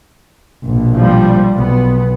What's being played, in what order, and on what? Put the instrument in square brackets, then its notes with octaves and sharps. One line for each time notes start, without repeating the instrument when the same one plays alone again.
[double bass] A#1 B2
[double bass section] F3 G3
[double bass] B1 [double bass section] B3